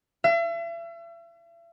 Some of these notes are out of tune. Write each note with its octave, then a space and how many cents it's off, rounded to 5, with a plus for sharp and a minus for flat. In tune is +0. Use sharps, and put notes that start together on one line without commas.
E5 +40